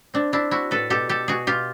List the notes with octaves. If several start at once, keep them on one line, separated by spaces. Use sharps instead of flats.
C4 D4
C4 D4 E4
C4 E4 F#4
A2 A4 B4
B2 G4 A4
B2 G4 A4
B2 F#4 G#4
B2 F4 G4